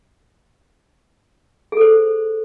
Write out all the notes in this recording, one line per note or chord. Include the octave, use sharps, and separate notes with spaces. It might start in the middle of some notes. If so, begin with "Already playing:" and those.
G#4 A4 C5